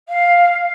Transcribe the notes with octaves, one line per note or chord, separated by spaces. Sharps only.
F5